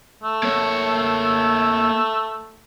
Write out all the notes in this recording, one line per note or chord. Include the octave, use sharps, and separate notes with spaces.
A3
A#3 C#5